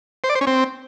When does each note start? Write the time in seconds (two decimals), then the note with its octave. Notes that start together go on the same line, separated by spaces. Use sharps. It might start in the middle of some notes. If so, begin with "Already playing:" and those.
0.24 C5
0.29 D5
0.35 C5
0.41 C#4
0.47 C4